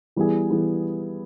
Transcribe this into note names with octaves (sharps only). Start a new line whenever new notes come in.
E3 G3 B3 E4 G#4
E3 G3 B3 E4 G#4